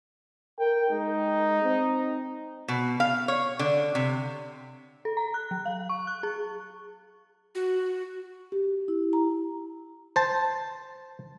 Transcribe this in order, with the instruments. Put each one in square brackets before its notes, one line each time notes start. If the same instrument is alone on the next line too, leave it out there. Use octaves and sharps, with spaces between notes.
[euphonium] A#4 [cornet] G5
[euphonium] G#3 [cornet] D#4
[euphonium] C4
[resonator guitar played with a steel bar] B2
F5
C#5
D3
C3
[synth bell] A4
A#5
F#6
F#3
F5
C#6
F#6
G#4
[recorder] F#4
[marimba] G4
E4
A#5
[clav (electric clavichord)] C5 A5